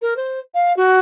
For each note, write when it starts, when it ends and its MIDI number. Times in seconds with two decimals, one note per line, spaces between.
0.02 0.14 70
0.17 0.39 72
0.54 0.73 77
0.77 1.00 66